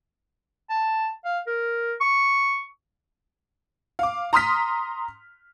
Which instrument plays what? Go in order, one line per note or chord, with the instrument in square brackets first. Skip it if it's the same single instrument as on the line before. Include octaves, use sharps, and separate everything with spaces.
[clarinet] A5
F5
A#4
C#6
[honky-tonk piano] F5 D6
A#5 C6 D#6 F6 B6